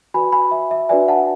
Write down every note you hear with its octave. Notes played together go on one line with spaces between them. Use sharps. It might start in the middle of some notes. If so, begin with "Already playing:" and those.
F#4 B4 D5 G#5 B5
G#5 B5
E5
E5
D4 F#4 B4 D5 E5 G#5
F#5 A5